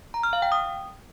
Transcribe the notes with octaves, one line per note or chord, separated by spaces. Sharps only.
A#5
F6
F5
G5
D#6